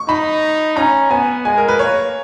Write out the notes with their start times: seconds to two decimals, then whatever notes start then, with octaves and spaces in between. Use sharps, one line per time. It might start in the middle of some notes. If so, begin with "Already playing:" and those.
Already playing: C#6
0.09 D#4 B5
0.77 C#4 A#5
1.11 B3 G#5
1.45 G#3 G#5
1.58 A#4
1.68 B4
1.79 A#3 C#5